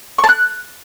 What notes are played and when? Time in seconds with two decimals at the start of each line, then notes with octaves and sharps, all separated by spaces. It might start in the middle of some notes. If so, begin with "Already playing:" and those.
0.18 C#6
0.24 A5
0.29 F#6